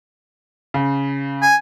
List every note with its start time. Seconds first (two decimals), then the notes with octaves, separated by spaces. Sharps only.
0.74 C#3
1.42 G#5